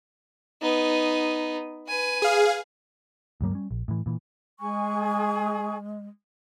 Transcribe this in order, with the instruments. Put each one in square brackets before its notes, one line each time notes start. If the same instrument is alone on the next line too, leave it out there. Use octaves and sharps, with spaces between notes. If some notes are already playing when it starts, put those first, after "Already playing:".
[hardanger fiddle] B3 D#4
B4 G#5
[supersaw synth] G#4 F5
[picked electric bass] D2 G2 F#3 A#3
G3 C#4
A#1
A2 E3
A#2 E3
[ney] G#3 [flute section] G#4 G#5 C#6